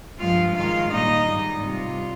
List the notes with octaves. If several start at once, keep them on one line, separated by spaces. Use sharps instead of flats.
G2 F3 G#3 F4 F5
G#2 D#3 G#3 F4 F5
A#2 G3 D#4 D#5
G#2 G3
C3 G3 F4